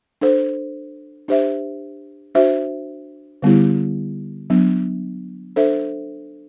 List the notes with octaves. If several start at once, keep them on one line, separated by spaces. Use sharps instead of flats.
D4 A4 C5
D4 G4 C5 E5
D4 F#4 C5 E5
D3 G3 B3 E4 G4
F#3 B3 D4
D4 A4 C5 E5